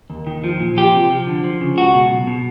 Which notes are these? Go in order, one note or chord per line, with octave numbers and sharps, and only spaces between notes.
D#2
D#3
F3
A#2
F3 G4
C3
F3
D3
F3
C#3
C#2 F#4
B2
B1
B2